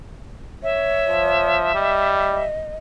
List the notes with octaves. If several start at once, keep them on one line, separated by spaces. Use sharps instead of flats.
C#5 E5
F3
G3 D#5